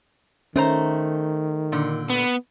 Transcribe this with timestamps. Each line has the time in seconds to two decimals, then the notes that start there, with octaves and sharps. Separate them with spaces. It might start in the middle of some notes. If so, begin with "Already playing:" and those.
0.56 D#3 A3 C#4 C5 A#5
1.72 A#2 D3
2.10 B3